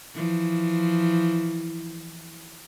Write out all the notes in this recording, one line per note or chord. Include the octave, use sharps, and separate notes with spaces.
E3 F3